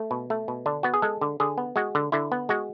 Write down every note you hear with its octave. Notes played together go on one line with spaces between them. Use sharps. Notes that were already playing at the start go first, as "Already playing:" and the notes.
Already playing: A3
B2
A3
B2
D3 D4
B3 F#4
G#4
G#3 A4
D3
D3 G#4
B3
G#3 F#4
D3
D3 E4
B3
G#3 F#4